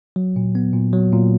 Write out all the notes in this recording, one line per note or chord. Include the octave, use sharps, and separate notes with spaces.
F#3
A#2
B3
A#2
F#3
A#2